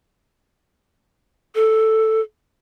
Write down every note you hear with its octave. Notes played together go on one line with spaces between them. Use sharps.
A4